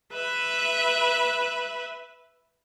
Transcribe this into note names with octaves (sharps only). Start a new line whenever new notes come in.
B4 E5